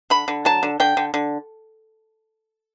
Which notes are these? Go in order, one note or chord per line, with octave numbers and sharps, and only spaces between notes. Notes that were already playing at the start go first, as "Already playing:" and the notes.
D3 B5
D3
F#3 A5
D3
D3 G5
D3
D3